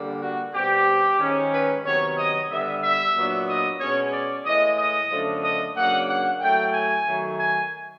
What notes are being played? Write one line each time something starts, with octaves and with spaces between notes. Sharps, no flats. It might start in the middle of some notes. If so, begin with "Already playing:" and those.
Already playing: D3 G3 A#3
F#4
B2 G3 C4 G4
G#2 D#3 G#3 C#4
B4
C3 D#3 F#3 B3 C#5
D#5
D3 G3 B3 E5
E5
A#2 F#3 B3 D4
D#5
B2 G#3 C#4 C#5
D5
A2 E3 G#3 D#5
D#5
F#2 D3 F3 A3 D4
D#5
C#3 F#3 A#3 D4 F#5
F#5
A2 F#3 A3 G5
G#5
D#3 F#3 A3
G#5